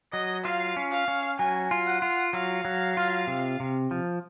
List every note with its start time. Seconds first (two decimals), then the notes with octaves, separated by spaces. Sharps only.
0.13 F#3 D#5
0.44 F4 F5
0.77 C#4
0.92 F5
1.08 C#4
1.39 F#3 G#5
1.71 F4
1.86 F#5
2.02 F4
2.33 F#3 F5
2.65 F#3
2.97 F4
3.27 C3
3.60 C3
3.91 F3